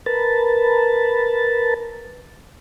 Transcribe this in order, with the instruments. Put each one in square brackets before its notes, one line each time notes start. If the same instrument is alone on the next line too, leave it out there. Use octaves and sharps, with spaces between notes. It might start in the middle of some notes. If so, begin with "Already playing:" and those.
[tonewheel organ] A#4 B4 A5